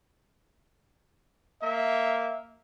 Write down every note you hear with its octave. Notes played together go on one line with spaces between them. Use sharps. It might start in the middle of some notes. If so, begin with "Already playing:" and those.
A#3 E5